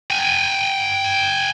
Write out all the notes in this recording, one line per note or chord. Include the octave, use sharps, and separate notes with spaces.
G5 G#5